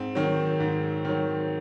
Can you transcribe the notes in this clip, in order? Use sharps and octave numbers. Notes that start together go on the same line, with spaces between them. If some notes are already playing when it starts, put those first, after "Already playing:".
Already playing: G#2 C4
D#3 F#3
G#2
D#3 F#3